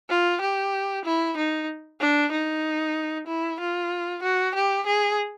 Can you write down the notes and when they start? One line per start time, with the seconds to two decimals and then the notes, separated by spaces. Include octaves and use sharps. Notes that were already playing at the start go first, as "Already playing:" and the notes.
0.10 F4
0.41 G4
1.05 E4
1.37 D#4
2.00 D4
2.32 D#4
3.27 E4
3.60 F4
4.23 F#4
4.55 G4
4.86 G#4